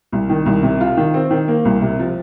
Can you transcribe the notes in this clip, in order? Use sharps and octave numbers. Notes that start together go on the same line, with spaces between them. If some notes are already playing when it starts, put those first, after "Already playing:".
C2
D#3
C2
C3
F4
D#3
C4
D#3
A#3
C2
C3
F3